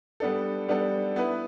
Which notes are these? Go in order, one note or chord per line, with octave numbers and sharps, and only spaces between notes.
G3 B3 D4 A4
G3 B3 D4 A4
B3 E4 B4